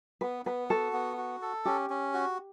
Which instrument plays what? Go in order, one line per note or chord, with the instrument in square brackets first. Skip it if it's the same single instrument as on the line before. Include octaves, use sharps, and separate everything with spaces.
[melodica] B3 [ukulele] B4
[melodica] B3 [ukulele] B4
[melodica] F#4 [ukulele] A4
[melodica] B3
F#4
A4
[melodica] C#4 [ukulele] G4
[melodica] C#4
F#4